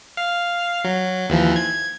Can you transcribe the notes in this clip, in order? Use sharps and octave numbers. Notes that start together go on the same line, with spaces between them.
F5
F#3
D#2 E3 F3
G#6